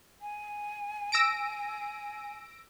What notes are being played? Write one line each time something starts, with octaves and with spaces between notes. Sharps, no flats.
G#5
E6 A#6 D7